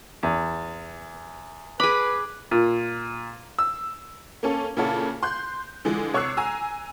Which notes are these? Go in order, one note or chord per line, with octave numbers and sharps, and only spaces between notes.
E2
G#4 B4 B5 D6
A#2
E6
A#3 C#4 A4
A#2 C#3 E4 A4 C#5
C6 F#6 G6
D3 E3 F3 G#3
C3 C#5 C#6 E6 F#6 C7
G#5 A#5 E6